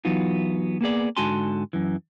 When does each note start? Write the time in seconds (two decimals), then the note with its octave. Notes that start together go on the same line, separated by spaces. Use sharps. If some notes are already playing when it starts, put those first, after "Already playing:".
0.05 E3 F#3 B3 D#4 F4
0.81 A#3 B3 G#4 D5
1.17 G#2 D3 F#4 G#5 A5 C6
1.73 F#2 E3